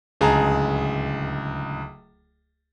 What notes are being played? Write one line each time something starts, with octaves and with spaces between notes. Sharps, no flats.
D1 C#2 G#4 A5 A#5